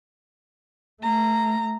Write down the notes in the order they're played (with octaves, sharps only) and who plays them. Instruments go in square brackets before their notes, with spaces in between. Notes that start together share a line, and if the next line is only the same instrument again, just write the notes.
[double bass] A3 [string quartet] A#5